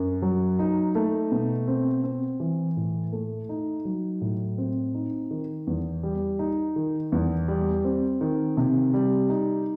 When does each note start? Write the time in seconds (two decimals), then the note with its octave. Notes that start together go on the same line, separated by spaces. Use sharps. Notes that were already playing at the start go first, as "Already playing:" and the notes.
Already playing: F#2
0.22 F#3
0.59 D#4
0.95 A3
1.32 B2
1.68 C4
2.04 C4
2.40 E3
2.77 A2
3.12 A3
3.49 D#4
3.85 F#3
4.21 A2
4.58 C4
4.94 D#4
5.31 D#3
5.67 E2
6.03 G3
6.39 D#4
6.76 D#3
7.12 E2
7.48 G3
7.85 C4
8.21 D#3
8.57 C3
8.94 G3
9.29 D#4